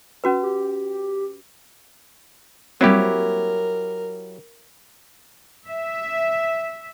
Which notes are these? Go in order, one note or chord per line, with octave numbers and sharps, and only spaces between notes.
C#4 F#4 B4
G4
F#3 G3 A#3 C4 E4 G4 A#4
E5